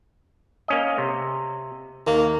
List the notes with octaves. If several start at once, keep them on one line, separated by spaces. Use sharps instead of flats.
A#3 C#4 D#5
C3
D#2 A#3